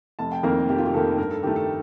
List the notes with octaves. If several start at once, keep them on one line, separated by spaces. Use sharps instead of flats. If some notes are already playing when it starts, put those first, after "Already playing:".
F1 A5
G5
F2 D#3 A#3 A#4
F1 G4
F4
G4
F2 D#3 A#3 A4
G2 A#4
A4
D#3 A3 G4
A4